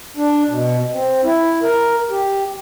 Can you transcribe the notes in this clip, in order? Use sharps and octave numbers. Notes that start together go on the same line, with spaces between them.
D4
B2
C4
E4
A#4
G4